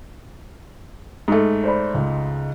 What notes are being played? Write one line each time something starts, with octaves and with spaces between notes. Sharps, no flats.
G#2 A3
C5 D5 B5
C#2